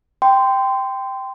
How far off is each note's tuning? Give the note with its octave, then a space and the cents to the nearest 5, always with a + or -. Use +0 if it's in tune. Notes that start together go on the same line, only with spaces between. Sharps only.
G5 +0 C6 -20